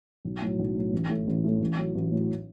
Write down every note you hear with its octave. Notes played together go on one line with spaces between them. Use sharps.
B1
A2 F#3
B1
A2 F#3
A1
A2 A3 E4
A1
A2 A3 E4
A1
A2 F#3
A1
A2 F#3